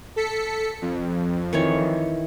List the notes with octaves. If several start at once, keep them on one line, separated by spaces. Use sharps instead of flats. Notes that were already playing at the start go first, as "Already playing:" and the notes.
A4 B6 C#7
F2
D#3 E3 C#5